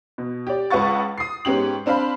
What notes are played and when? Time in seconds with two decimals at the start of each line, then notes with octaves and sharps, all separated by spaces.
0.18 B2
0.47 G4 D5
0.70 C#2 B4 F#5 C#6 A6
1.18 D#6 C7
1.45 G#2 B3 C#4 G4 F#7
1.86 C4 D4 C5 F5 B5